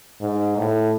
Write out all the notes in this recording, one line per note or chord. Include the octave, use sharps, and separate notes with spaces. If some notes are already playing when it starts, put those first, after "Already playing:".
G#2
A2